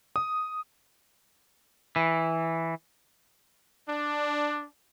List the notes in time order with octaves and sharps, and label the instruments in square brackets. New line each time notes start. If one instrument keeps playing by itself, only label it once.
[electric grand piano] D#6
[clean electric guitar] E3
[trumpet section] D4